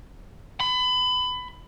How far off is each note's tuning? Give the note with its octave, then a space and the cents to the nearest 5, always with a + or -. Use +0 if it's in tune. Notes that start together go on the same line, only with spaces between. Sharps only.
B5 +25